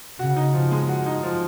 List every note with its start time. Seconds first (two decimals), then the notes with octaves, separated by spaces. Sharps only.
0.19 C#3 F#4
0.36 D#4
0.54 F3
0.71 G#3
0.89 F#4
1.06 D#4
1.23 F3